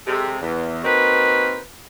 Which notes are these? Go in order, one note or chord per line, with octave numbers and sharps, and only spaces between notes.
C3 G#3 A4
E2
A#3 C4 D#4 F#4 A#4 B4